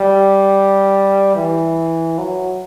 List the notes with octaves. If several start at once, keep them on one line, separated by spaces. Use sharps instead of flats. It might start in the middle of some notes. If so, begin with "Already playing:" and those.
Already playing: G3
E3
F#3